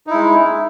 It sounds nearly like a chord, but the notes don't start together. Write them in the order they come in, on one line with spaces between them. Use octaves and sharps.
D#4 E4 G#3